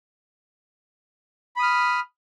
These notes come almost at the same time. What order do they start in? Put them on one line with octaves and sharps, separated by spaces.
B5 D#6 F6